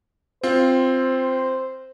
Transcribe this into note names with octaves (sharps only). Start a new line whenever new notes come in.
C4 F4 C5